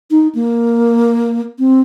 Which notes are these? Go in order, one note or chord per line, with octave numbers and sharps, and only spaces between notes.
D#4
A#3
C4